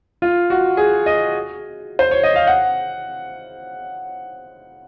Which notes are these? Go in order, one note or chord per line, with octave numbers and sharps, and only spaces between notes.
F4
F#4
G#4
D#5
C5
C#5
D#5
F5
F#5